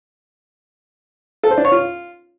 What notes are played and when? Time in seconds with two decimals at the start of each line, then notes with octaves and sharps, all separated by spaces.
1.43 A4
1.51 C5
1.58 D4
1.65 C#5
1.72 F4